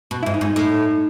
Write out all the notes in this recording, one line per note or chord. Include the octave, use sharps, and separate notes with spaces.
B2
E4
G#2
D#4
G#2
D#4
A2